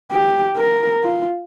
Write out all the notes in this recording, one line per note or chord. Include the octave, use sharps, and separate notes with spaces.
G4
A#4
F4